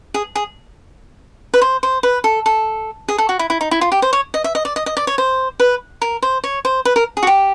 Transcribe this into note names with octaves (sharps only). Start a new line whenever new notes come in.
G#4
G#4
B4
C5
C5
B4
A4
A4
G#4
A4
F#4
E4
E4
D#4
E4
F4
G4
C5
C#5
D#5
E5
D#5
D5
D#5
D#5
D5
C#5
C5
B4
A#4
C5
C#5
C5
B4
A#4
G#4
F#4
G4